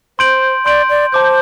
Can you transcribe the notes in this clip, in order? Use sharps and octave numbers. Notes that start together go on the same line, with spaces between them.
C5 C6 G6 D7 F#7
D5 C6 G6 D7 F#7
D5
C5 A5 D6 G6